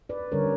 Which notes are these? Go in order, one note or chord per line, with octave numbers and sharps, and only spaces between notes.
B4 D5
D3 G3 C#4 A#4 C#5